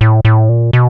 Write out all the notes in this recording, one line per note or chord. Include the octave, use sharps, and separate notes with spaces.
A2
A2
A#2
B2